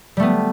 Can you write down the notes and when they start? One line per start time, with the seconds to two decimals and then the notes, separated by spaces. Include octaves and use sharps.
0.17 G3
0.20 A3
0.22 B3